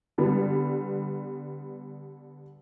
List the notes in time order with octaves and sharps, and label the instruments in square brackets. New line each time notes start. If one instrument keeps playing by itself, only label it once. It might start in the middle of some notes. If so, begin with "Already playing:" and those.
[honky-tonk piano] D3 G3 B3